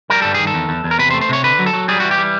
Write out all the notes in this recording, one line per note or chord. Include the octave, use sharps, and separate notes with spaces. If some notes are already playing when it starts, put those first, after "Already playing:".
G3 A#4
G2 A4
D#3 G#4
A4
E2
E2
E2
A#4
C3 B4
C5
A3
C5
C3 C#5
D3 B4
F#3
A4
F#3
G3 G#4
E3 F#4
G4
G3